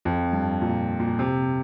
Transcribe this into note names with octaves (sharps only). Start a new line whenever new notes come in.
F2
G2
A#2
A#2
C3